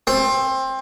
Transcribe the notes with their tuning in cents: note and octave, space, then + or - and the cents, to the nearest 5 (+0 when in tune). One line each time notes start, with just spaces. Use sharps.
C4 +20